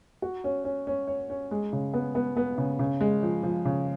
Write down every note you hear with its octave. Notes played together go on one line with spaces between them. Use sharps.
F#4
C#4
C#4
C#4
C#5
C#4
G#3
C#3
B3
B3
B3
C#3
C#3
G#3
F3
F3
C#3